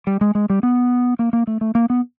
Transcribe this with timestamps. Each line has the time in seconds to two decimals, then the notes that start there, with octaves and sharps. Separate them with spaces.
0.07 G3
0.21 G#3
0.35 G#3
0.50 G3
0.63 B3
1.19 A#3
1.33 A#3
1.47 A3
1.61 A3
1.75 A#3
1.90 B3